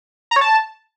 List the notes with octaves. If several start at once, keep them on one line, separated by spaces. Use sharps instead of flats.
A#5
C#5
A5